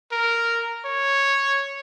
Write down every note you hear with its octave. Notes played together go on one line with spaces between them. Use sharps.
A#4
C#5